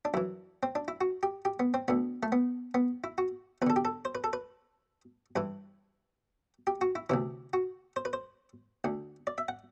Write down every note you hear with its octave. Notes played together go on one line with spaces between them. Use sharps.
D4
F#2 E3 E4
C4
D4
E4
F#4
G4
G4
B3
C4
D2 D3 B3
A3
B3
B3
E4
F#4
E2 D3 A4 B4
G4
A4
C5
B4
A4
B4
G2 E3 B4
G4
F#4
E4
D2 C3 E3 E4
F#4
C5
B4
C5
D2 D3
D5
E5
F#5